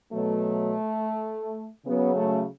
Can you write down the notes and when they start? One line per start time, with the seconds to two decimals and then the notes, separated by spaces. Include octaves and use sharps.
0.13 B2 F#3 A3
1.86 C#3 F#3 B3
2.15 A3